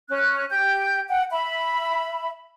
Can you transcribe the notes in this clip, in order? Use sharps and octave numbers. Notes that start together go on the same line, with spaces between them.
C#4 F#6
G4 G5 G6
F#5 G5
E5 B5